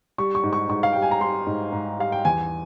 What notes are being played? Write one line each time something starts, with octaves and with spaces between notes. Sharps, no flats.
G3 C#6
C#6
G#2
C#6
G#2 C#6
F5
G3 G5
G#5
A#5
G3 C6
G#2
G#2
G3 F5
G5
E2 G#5